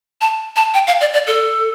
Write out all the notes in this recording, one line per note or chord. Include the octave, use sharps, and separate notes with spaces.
A5
A5
G5
F5
D5
D5
A4